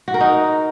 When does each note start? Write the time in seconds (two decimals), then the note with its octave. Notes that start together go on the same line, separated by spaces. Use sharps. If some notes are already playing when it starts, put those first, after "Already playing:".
0.08 F#4
0.14 A#4
0.20 D#4